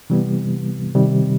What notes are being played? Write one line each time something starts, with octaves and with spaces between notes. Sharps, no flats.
C3 E3 G3 B3
C3 D#3 G3